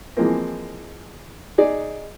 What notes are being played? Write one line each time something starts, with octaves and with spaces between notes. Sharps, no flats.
E3 F3 G#3 A#3 C4
D#4 G#4 D5